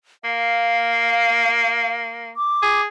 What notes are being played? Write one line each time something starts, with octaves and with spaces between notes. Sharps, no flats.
A#3 F5
D6
G#4